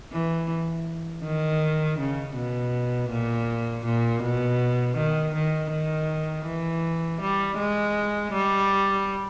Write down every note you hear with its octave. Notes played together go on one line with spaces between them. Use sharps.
E3
D#3
C#3
B2
A#2
A#2
B2
D#3
D#3
D#3
E3
G3
G#3
G3